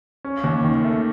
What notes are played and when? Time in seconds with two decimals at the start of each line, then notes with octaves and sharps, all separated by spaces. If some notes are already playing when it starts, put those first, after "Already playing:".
0.24 C#4
0.44 D#2
0.64 D#3
0.84 A3